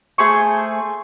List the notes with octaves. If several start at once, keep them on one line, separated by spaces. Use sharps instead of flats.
A3 G#4 C5 C#6